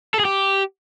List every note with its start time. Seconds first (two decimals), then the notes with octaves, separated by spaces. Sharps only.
0.14 A4
0.20 G#4
0.25 G4